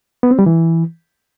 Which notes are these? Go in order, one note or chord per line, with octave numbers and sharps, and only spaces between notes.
B3
C4
G3
E3